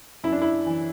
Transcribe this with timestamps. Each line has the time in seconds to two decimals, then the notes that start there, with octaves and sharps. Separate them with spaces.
0.24 F#2 E4
0.32 D4
0.42 E4
0.66 E3